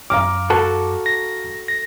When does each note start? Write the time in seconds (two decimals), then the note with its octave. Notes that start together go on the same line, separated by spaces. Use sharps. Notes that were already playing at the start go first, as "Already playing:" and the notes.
0.10 F#2 F5 A#5 D6 F6
0.50 F#4 A4
1.06 A#6
1.68 A#6